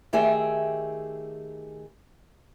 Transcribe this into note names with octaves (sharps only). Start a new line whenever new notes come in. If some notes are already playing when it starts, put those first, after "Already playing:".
D#3 A3 G4 G#4 E5